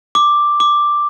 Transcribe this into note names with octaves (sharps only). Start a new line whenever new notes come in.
D6
D6